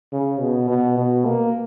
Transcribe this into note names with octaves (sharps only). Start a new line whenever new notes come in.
C#3
B2
B2
B2
A#3